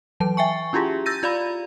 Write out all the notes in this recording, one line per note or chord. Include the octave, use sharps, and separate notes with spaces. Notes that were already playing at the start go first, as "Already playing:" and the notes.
E3 F#3 A5
E5 G5 G#5 C#6
C#4 E4 F4 G4 G#4
E6 G6 A6 A#6 D#7
F4 D5 F5 B5